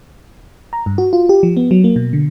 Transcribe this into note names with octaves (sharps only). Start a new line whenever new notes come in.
A#5
G2
F#4
F4
G4
F3
B3
F#3
A#3
B2
D3